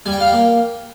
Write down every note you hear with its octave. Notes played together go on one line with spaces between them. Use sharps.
G3 G#5
G5
F5
G5
A#3